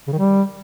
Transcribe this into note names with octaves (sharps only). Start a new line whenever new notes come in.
C#3
D#3
G3